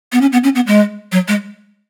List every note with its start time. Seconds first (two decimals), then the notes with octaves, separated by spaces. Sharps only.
0.12 B3
0.21 C#4
0.32 B3
0.44 C#4
0.55 B3
0.67 G#3
1.12 F#3
1.28 G#3